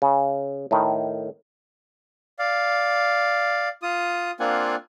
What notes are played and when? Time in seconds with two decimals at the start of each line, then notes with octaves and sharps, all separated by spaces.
0.02 C#3
0.71 A2 D#3
2.39 D5 F5
3.82 F4 D#6
4.40 A#3 C4 D4 F4 F#5 G#5